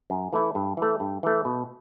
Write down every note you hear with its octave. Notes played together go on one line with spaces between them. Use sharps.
F#2
E3 A3 E4
G2
E3 A3
G2
E3 A3
B2